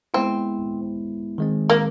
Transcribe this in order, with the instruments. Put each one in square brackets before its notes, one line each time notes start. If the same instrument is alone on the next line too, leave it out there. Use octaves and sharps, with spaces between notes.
[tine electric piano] G#3 B3 E4 [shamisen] C4
[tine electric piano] D#3 G#3 C4
[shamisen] A#3